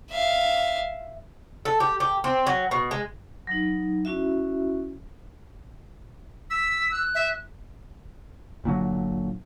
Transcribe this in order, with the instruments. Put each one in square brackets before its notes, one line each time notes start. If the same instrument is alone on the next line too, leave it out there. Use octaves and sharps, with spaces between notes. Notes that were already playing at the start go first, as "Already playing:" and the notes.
[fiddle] E5 F5
[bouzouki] A4
G4
G4
C4
F#3
B2
G#3
[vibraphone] F#3 D#4
C#4 E4 F#4 E5
[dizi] E6 [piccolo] B6
[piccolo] F#6
[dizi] E5
[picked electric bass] G1 A#2 D3 F#3